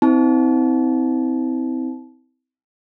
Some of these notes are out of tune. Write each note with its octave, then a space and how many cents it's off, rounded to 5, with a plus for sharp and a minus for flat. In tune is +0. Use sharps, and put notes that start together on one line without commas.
C4 -20 E4 -40 A5 -30